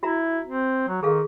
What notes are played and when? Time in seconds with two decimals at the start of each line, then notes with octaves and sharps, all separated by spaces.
0.03 E4 F#4 E5 A#5
0.45 C4
0.88 F#3
1.03 D#3 G#4 A4 F5